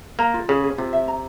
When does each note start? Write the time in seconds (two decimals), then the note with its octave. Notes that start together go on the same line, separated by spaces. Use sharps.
0.19 A#3 A#5
0.34 F4
0.48 C#3 G#4
0.63 G#4
0.78 C3 F4
0.93 E5
1.08 A#5